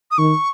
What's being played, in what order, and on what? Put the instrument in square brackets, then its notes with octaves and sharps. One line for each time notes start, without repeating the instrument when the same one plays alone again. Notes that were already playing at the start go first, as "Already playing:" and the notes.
[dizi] D#6
[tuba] D#3 [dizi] C#6